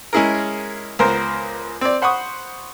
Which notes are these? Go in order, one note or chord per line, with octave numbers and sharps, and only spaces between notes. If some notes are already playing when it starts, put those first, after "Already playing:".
G#3 C#4 E4 G#4 A#4
C#2 B3 A#4 C5
C4 D5
C5 F#5 B5 C#6 D#6